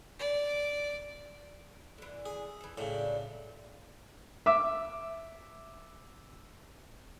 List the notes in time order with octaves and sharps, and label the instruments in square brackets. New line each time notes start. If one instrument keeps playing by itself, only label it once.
[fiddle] D5
[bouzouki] D3 E3
[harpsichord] G#4
[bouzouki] E3 A4
[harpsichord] A2 C#3 [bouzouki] F#3 G3 D4
[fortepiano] E5 D6 E6